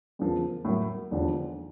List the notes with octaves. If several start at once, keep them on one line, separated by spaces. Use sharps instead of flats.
E2 C#3 F3 A#3
A2 F#3 A#3
E1 D#2 D3 F3